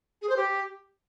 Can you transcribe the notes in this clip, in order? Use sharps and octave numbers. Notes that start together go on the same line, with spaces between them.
G#4
C5
G4